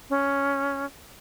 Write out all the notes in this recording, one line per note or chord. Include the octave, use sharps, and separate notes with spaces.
C#4